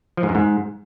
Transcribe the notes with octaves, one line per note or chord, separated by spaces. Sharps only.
F3
G#2
F#2
G#2